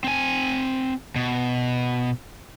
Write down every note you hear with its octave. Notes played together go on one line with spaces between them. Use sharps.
C4 G#5
B2